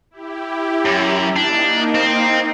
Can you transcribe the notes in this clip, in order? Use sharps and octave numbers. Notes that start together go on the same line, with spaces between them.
E4 G4
F#2
A#3 D4 D#4
C4